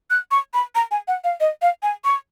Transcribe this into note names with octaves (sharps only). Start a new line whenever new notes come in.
F#6
C#6
B5
A#5
G#5
F#5
F5
D#5
F5
G#5
C#6